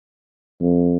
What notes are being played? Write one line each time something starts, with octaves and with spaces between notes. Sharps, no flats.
F2